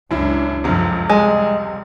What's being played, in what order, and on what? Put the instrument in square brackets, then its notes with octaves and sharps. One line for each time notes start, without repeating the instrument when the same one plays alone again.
[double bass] C#2 D4 [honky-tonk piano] F#2 E4
[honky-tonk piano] F1 C#2 C3 [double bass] F#2 F3
[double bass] G3 [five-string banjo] G#3